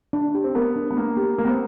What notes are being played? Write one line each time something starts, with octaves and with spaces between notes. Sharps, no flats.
D4
G4
C4
B3 A#4
D4
B3
A#3 D4
G4
A#3 A#4
B3
C4